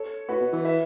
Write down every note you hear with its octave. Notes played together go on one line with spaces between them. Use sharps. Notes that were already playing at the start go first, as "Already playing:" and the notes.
Already playing: A4 C#5
A2 F#4 B4
B2
E3
B4 E5